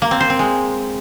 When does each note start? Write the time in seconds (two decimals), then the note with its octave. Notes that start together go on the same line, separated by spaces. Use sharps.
0.02 A#3
0.11 C4
0.20 C5
0.30 C4
0.39 G#3